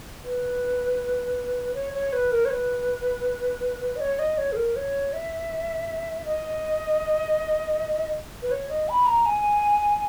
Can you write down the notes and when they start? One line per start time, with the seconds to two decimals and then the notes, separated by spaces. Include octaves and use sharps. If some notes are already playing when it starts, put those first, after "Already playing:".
0.24 B4
1.74 C#5
1.93 C#5
2.13 B4
2.31 A#4
2.45 C#5
2.51 B4
3.96 D#5
4.01 C#5
4.19 D#5
4.38 C#5
4.52 G#4
4.56 A#4
4.76 C#5
5.13 E5
6.25 D#5
8.43 B4
8.51 C#5
8.69 D#5
8.89 B5
9.06 A#5
9.26 G#5